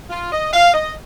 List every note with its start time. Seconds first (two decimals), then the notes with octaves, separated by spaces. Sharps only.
0.10 F4
0.31 D#5
0.53 F5
0.74 D#5